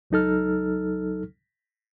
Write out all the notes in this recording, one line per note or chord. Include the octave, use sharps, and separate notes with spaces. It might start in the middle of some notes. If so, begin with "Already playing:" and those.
C#2 F#3 D#4 A4 F6